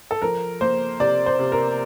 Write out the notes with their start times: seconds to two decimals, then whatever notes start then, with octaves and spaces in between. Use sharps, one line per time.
0.11 A4
0.22 F3 A#4
0.61 A#3 C5
1.00 C3 D5
1.26 C5
1.39 C3
1.52 A#4